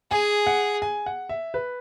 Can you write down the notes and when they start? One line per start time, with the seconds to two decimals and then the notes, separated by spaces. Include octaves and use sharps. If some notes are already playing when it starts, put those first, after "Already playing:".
0.11 G#4 G#5
0.47 F#5
0.82 G#5
1.06 F#5
1.29 E5
1.54 B4